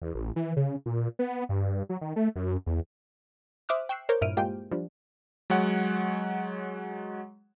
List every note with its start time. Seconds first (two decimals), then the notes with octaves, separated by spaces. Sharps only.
0.02 E2
0.15 A1
0.36 E3
0.56 C#3
0.86 A#2
1.19 B3
1.49 G2
1.89 F#3
2.01 D#3
2.16 A3
2.36 F#2
2.66 E2
3.69 C5 E5 D6 D#6 F6 F#6
3.89 G5 C#6 E6 F#6 C7
4.09 A#4 C5 C#5 D6 G6
4.21 G2 A#2 E4 F6 D7 D#7
4.37 G#3 A#3 F4 G4 C5 G5
4.71 F3 G3 D4
5.50 F#3 G#3 C#5 F#5